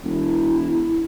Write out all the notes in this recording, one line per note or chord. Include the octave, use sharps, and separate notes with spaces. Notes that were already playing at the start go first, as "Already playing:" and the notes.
E1 E4